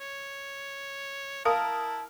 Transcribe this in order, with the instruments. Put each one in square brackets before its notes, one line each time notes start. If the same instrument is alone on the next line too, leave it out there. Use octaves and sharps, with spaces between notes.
[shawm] C#5
[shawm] E4 [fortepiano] A#4 D#6 [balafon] F5 [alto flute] A5